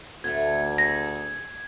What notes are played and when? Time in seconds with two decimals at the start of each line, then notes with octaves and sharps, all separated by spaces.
0.24 D2 D3 A3 G#6
0.78 G#4 A4 A#6